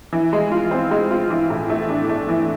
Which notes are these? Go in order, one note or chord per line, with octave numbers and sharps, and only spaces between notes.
E3
G#3
F4
C4
G#3
F4
E3
A2
A3
D4
A3
E3